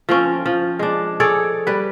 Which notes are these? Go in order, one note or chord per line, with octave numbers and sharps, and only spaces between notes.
F3 C4 C#4
F3
G#3 D4
G#4 A4 C#5 D5
G3 B4